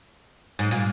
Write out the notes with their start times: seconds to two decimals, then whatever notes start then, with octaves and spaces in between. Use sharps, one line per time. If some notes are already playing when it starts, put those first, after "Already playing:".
0.59 G#2
0.71 A#2